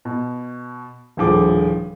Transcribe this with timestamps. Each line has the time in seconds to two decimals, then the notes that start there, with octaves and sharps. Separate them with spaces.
0.05 B2
1.17 D#1 A2 D3 F3 G#4 D6